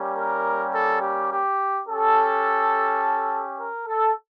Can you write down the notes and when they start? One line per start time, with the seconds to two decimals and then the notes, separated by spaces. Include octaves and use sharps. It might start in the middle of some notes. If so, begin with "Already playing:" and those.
Already playing: G3 A#3 C#4 G4
0.15 A#4
0.73 A4
1.01 G4
1.30 G4
1.87 C#4 G4 A4
3.58 A#4
3.87 A4